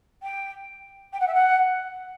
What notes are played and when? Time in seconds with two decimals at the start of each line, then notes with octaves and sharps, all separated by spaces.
0.22 G5
1.13 G5
1.20 F#5
1.27 E5
1.34 F#5